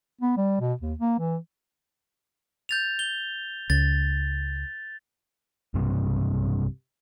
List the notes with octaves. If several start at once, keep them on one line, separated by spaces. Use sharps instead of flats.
B3
G3
B2
D#2
A#3
E3
G6 A6 F7
G7
C#2 A6
B1 G2 C3